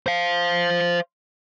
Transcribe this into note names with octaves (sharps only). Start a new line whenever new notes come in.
C5 F5